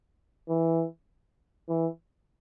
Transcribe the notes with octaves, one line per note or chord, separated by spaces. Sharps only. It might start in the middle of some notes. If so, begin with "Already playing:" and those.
E3
E3